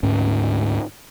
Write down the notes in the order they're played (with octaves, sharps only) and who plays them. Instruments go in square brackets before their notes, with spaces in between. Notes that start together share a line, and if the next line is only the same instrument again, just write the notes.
[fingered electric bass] D2 G#2 C#4